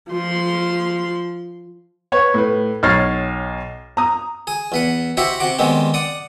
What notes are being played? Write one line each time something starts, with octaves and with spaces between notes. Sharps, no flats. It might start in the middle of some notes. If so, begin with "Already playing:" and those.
F3 C6
B4 C#5
A2 B4
B1 C#5 F6 A6 C7
A#5 D#6
G#4
E2 B4 F#5
E4 F#4 G4 C5 E5 F#5
C3 F#4 F#5 D6
D#3 G3 G#3 B3 C4
D5 F#5 D#6